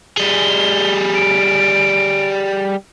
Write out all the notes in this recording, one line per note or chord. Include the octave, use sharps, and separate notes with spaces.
G3 G#4 G7
D7